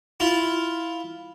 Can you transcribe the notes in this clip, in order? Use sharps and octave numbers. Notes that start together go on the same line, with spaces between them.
E4 F4